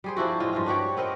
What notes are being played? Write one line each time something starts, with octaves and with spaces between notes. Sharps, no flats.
G3 G#4 C5
F3 D4 E4 F#4
A2 G#3 F4
G2 G#3 F4
D4 F#4 G4 C#5
B3 C4 A#4 D#5